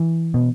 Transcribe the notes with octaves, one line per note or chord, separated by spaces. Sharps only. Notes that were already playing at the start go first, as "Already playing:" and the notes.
Already playing: E3
B2